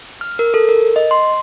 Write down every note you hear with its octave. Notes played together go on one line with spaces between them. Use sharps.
F6
A#4
A4
A#4
D#5
C6